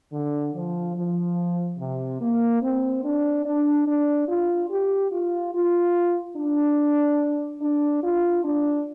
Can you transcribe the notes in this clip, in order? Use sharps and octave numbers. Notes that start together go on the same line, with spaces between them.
D3
F3
F3
C3
A#3
C4
D4
D4
D4
F4
G4
F4
F4
D4
D4
F4
D4